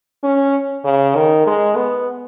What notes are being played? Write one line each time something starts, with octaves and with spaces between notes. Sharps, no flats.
C#4
C#3
D#3
G#3
B3